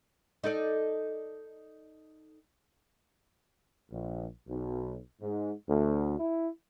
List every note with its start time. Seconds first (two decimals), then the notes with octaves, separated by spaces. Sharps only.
0.44 D#4 A4 D5
3.92 A#1
4.48 B1
5.21 G#2
5.70 D2
6.20 E4